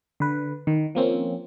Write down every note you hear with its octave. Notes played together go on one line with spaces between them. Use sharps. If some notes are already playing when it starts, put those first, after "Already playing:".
D3 B4
D#3
F3 A#3 C4 C#4